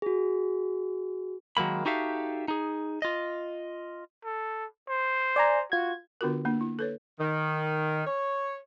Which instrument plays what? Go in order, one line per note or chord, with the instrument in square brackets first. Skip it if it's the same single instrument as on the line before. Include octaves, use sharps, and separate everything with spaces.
[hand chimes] F#4 G#4
[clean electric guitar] D#3 F#3 G#3 A#3 B5
D#4 F#4 G4 A4 E5 F5
D#4 G#4
F4 D#5
[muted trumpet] A4
C5
[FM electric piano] D5 G#5 A#5
[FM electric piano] F4 G#6 [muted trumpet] F#4
[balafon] D3 B3 D4 F4 F#4 A#4
A#3 D4
E4
A4 B4 C#5
[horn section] D#3
C#5